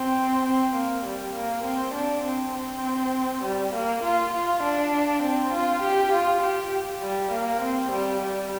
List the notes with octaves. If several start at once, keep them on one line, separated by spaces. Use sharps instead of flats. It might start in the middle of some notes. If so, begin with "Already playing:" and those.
Already playing: C4
C4
A#3
G3
A#3
C4
D4
C4
C4
G3
A#3
F4
F4
D4
C4
F4
G4
F4
G4
G3
A#3
C4
G3
G3